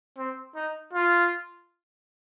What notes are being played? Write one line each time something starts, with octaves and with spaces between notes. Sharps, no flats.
C4
D#4
F4